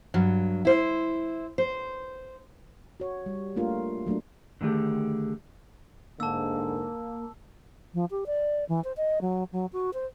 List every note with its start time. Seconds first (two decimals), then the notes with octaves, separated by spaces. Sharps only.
0.14 G2 F#3
0.65 E4 C5
1.58 C5
3.00 F#4 C#5
3.26 G3
3.56 A3 A#3 D4 F4 A#4
4.06 F#3 A3 A#3 D4
4.61 D3 D#3 A3 G4 G#4
6.20 G#2 D3 A#3 A5 E6
7.94 F3
8.11 G4
8.26 D5
8.69 E3
8.84 C5
8.97 D#5
9.21 F#3
9.52 F#3
9.73 F#4
9.93 C5